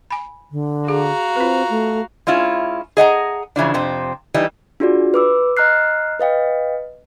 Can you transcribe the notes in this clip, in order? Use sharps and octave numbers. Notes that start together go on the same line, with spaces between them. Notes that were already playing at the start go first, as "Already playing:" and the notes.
G#5 B5
D3
F#4 G#4 F5 A#5
C4 F4 B4
A3
G#3 C#4 E4 F4
G#4 D#5 F#5 A#5
C#3 E3 F3 D4
F2 C3 C4
E3 G3 D#4
D4 F4 F#4 G#4 D5
B4 D6 E6
D#5 A#5 F6 F#6 C7
B4 D#5 F5 G5